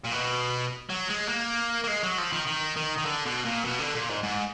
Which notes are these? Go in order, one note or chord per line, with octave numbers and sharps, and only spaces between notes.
A#2
B2
F#3
G#3
A#3
A#3
G#3
F#3
F3
D#3
D#3
D#3
D#3
D3
B2
A#2
B2
D3
A#2
G#2
G#2